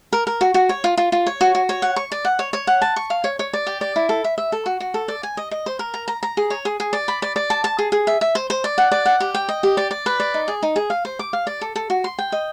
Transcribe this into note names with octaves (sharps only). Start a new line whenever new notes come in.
A#4
A#4
F#4
F#4
C#5
F4
F4
F4
C#5
F#4
F#4
C#5
F#5
C#6
D5
F#5
C#5
C#5
F#5
A5
C#6
F5
C#5
C#5
D5
G4
D5
E4
A4
E5
E5
A4
F#4
F#4
A4
D5
G#5
D#5
D#5
C5
A#4
A#5
A#5
A#5
G#4
C#5
G#4
G#4
D5
B5
D5
D5
A5
A5
G#4
G#4
E5
E5
C5
C5
D5
F#5
D5
F#5
G4
G5
D#5
G4
D5
D5
B4
D5
D#4
G#4
D#4
G#4
F5
C5
D6
F5
D5
A4
A4
F#4
C6
G5
D#5